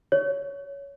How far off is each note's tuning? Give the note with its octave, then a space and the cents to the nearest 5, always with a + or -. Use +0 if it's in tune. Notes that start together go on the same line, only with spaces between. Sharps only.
C#5 +15